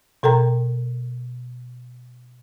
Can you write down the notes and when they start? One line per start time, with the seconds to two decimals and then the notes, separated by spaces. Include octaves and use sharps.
0.23 B2 A4 A#4 G5 A#5